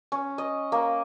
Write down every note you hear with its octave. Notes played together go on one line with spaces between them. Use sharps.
C#4
D#5
A#3